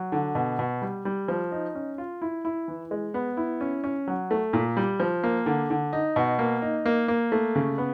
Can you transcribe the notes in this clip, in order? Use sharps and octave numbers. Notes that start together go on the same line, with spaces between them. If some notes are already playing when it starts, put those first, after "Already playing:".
Already playing: F#3
D3
B2
B2
G3
G3
F3
D#4
C#4
F4
E4
E4
E3
G#3
B3
E4
C#4
C#4
F#3
A3
A#2
G3
F3
A#3
D3
D3
D#4
B2
A#3
D#4
A#3
A#3
A3
C#3
B3